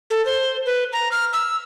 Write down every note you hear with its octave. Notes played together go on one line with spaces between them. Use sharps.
A4
C5
B4
A#5
F6
E6